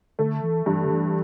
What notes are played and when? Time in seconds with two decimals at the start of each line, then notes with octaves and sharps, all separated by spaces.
0.19 D3 A3
0.43 E3
0.66 G2 E3
0.85 D3
0.90 E3